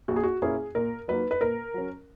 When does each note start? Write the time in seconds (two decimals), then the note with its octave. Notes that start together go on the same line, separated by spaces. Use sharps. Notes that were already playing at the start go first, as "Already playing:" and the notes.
0.08 A#1 F#4
0.16 G#4
0.23 F#4
0.42 A#2 A#3 C#4 E4 G#4
0.75 A#2 A#4
1.08 F#3 A#3 D#4 B4
1.31 B4
1.41 A#2 A#4
1.74 F#3 C#4